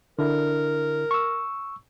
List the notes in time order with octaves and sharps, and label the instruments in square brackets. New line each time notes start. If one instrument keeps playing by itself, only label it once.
[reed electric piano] D3 D4 E4 [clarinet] A#4
[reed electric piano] C#6 E6